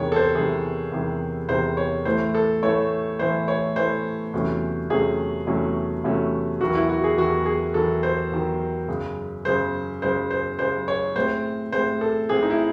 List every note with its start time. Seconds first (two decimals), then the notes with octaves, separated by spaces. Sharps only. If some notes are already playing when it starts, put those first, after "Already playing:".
Already playing: E2 C3 D#3 G#3 C#5
0.12 A4
0.16 C5
0.35 E2 C3 D#3 G#3 G#4
0.92 E2 C3 D#3 G#3
1.49 E2 C3 D#3 G#3 C5
1.77 C#5
2.05 A2 E3 A3 C5
2.34 A4
2.63 A2 E3 A3 C#5
3.19 A2 E3 A3 C5
3.48 C#5
3.76 A2 E3 A3 C5
4.34 E2 C3 F#3 A3 C#4
4.90 E2 C3 F#3 A3 C#4 G#4
5.47 E2 C3 F#3 A3 C#4
6.04 E2 C3 F#3 A3 C#4
6.60 E2 D#3 F#3 F#4
6.75 E4
6.89 F#4
7.04 G#4
7.17 E2 D#3 F#3 F#4
7.46 G#4
7.74 E2 D#3 F#3 A4
8.03 C5
8.32 E2 D#3 F#3
8.88 F#2 C#3 G#3
9.45 F#2 C#3 G#3 C5
10.02 F#2 C#3 G#3 C5
10.30 C5
10.59 F#2 C#3 G#3 C5
10.88 C#5
11.16 A2 G#3 C4 C5
11.72 A2 G#3 C4 C5
12.01 A4
12.29 A2 G#3 C4 G#4
12.43 D#4
12.50 E4